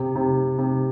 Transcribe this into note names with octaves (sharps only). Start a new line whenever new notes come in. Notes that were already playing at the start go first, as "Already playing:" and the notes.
Already playing: C3
C3
C3